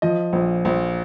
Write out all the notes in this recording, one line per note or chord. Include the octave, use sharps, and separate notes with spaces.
F3 D#5
A#1
A#1